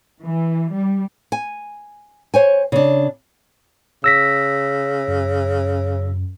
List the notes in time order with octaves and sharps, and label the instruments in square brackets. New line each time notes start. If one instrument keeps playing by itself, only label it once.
[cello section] E3
G3
[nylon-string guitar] G#5
C5 C#5 G#5
C#3 D4
[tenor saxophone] C#3 [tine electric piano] E6 A#6 B6
[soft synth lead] F#2